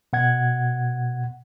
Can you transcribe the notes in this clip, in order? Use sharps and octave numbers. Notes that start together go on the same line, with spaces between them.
B2 F#5 G#6